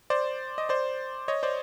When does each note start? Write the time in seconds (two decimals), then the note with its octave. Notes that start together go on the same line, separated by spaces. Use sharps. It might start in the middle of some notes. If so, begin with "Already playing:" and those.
0.10 C5 D5
0.58 D#5
0.69 C5 D5
1.28 C#5 D#5
1.43 C5 D5